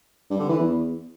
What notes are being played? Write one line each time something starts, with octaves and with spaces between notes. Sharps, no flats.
G2
D3
E3
E2